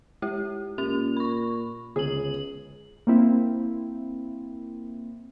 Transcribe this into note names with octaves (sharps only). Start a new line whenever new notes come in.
G#3 E4 G4
A#2 C#4 G4 F7
B5 C#6
C#2 D3 G#4 F#7
A#3 C4 E4